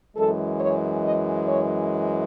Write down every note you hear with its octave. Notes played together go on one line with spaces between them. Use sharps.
F#2 E3 G#3 A4
C#5
D#5
C#5